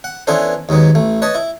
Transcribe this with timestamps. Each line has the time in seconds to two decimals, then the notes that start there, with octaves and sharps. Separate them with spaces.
0.04 F#5
0.27 E3 B3 C#4 D4 A4 C5
0.69 D#2 G#2 F#3 B3
0.95 A1 A3
1.22 B4 C#5 D#5 A5
1.35 E4